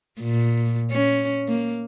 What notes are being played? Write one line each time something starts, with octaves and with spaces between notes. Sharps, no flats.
A#2
C#4
A#3